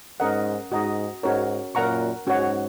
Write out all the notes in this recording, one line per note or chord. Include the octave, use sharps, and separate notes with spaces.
G#2 C#4 A#4 D#5 F#5
G#2 F#4 D#5 A#5
G#2 C#4 F#4 A#4 C#5
F#2 A#2 A#4 F#5 A#5 C#6
G#2 C#4 F#4 C#5 F#5